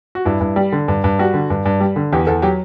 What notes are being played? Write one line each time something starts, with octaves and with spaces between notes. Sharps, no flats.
F#4
G2 E4
G2
G3
D3
G2
G2
G3 F#4
D3
G2
G2
G3
D3
E2 G4
E2 A4
F#3 G4